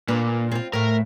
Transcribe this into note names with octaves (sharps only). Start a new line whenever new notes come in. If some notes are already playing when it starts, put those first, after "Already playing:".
A#2 A#3 D4 B4
C4 F4
A2 A3 A#4